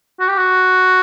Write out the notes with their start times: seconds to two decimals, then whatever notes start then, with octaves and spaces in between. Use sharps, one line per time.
0.20 F#4
0.29 G4
0.38 F#4